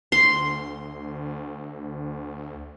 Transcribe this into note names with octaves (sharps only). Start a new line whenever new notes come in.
D2 C6